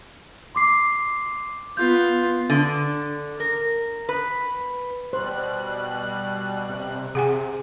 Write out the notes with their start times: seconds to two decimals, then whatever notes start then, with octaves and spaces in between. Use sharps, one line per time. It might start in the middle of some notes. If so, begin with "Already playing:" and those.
0.55 C6 D6 C7
1.77 B3 F4 G6
2.50 D3
3.40 A#4
4.09 B4
5.13 B2 G3 C5 F#6
6.70 C3
7.15 C3 G#4 F#5 G#5